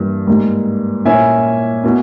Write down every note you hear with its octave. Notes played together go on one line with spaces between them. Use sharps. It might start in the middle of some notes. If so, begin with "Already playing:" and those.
Already playing: G2 E3 G3 A#3
G#2 G3 A#3
A#2 A#3 C#4 E4 E5 G#5
B2 A#3